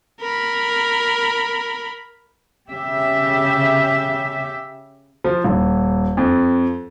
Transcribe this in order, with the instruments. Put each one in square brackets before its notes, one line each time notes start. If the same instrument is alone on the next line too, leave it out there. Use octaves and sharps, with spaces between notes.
[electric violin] A#4 B5
[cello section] C#3 G4 E5
[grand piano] F3
D#1
F2